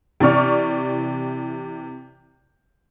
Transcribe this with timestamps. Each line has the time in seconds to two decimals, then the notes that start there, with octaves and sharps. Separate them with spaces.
0.20 C3 E3 C4 D5 C#6 F6